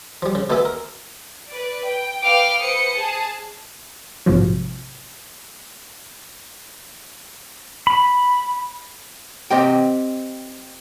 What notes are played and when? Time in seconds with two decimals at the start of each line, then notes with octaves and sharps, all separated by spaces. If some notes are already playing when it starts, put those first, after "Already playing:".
0.22 F3 G3
0.35 C#3
0.50 B2 A3 B3 A4 E5 G#5
0.65 A#4
1.48 B4 D5
1.85 G5
2.23 B4 F5 G5 D6 F6
2.60 B4 C5 D#6 C#7
2.94 G#4 A5
4.26 A#1 G#2 C3 F3 F#3
7.87 B5
9.50 C4 G4 D#5 G5